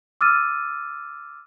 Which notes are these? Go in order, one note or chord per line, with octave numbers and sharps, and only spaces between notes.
D6 E6 F6 A6 D#7